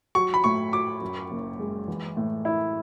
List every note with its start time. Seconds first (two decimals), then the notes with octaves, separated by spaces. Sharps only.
0.15 F#3 C#6
0.34 B5
0.44 A2 C#6
0.73 F#4 D6
1.01 F#2
1.31 F#1
1.59 G#3
1.88 E3
2.17 A2
2.45 E4